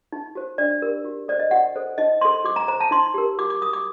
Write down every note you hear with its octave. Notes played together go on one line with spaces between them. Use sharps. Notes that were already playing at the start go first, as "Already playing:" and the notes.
D#4
F#4 C5
D4 D5
G4 A#4
F#4
A4 C5 D5
D#5
F#4 F#5
A4 C5
D#4 D#5
A4 C5 C6
F#4 D6
A#5
C5 A#5
A5
D#4 C6
G4 A#4
F#4 D6
D6
A#4 D#6
D6